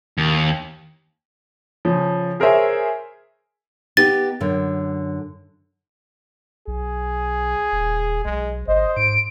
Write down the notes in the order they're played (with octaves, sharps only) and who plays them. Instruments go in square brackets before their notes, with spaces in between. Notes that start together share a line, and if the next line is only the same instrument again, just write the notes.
[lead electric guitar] D#2
[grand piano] C#3 F3
G#4 A#4 C5 C#5 E5 G#5
[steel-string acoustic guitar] B3 D#4 G4 [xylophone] A6
[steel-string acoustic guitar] F#2 D3
[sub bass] B1 [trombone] G#4
[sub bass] D#1
[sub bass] B1 [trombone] G#3
[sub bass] G#1 [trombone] C5 [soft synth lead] D#5
[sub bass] G#2 [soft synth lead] D7